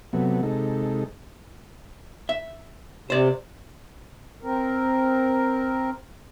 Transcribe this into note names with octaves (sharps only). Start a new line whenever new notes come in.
C3 F#3 A3 B3
C3 G#3 D#4 A4
E5
C3 C5 D5
C4 A#4